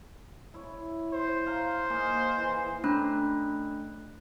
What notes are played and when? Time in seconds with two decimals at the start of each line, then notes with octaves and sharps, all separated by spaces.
0.54 E4 C#5
1.13 C5
1.46 F5 A#5
1.90 A#3 D#4 G#4
2.38 E3
2.84 A3 C#4 D4 B5 F#6